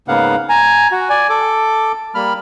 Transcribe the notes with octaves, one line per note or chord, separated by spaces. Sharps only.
G#2 C#3 A#3 B3 F5 F#5
G#5 A#5
F#4
D5 G#5
A4 D6
G3 A#3 B5 F6